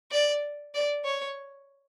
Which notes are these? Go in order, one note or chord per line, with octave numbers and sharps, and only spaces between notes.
D5
D5
C#5